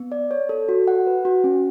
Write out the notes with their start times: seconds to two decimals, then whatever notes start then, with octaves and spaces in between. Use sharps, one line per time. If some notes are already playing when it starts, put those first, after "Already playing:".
Already playing: B3
0.12 D5
0.31 C#5
0.49 A4
0.69 F#4
0.88 F#5
1.07 B4
1.25 F#4
1.44 C#4